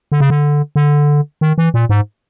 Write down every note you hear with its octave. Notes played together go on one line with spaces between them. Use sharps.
D3
C#3
D3
D3
D#3
E3
A#2
G#2